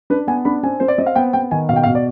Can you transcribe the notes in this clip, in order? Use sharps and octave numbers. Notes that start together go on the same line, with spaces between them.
D4 B4
B3 G#5
D4 B5
C4 G#5
C4 C5
D5
C4 D#5
F5
B3 G5
B3 G5
D#3 G#5
B2 F5
G5
F5
B2
D5